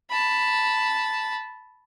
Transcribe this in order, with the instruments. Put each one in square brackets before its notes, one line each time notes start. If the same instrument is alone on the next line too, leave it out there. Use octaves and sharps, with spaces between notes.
[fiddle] A5 B5